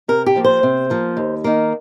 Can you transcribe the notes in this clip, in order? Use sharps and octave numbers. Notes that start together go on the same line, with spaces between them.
C3 A#4
G4
F3 A#3
C5
C3
F3 A#3
D#2
D#3 A#3